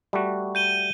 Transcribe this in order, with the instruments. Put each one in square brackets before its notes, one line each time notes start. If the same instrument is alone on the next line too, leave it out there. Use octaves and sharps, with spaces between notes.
[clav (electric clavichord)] G3 A3 F#4
[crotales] G6 D#7 G7